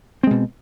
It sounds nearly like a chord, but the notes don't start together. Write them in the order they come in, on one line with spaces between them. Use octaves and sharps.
C4 G#3 B2